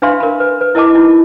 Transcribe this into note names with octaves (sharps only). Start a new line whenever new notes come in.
D4 B4 E5 F5 B5 C6
A#4 B5
B4
B4
E4 A#4 D#5 A5 D6
D#4 E4